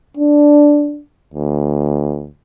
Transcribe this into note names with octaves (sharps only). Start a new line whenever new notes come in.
D4
D2